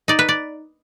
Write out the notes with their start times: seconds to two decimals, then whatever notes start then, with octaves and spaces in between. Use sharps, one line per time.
0.08 D#4 D5
0.19 B4
0.29 D5